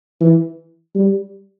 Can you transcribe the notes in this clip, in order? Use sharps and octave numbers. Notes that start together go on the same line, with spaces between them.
E3
G3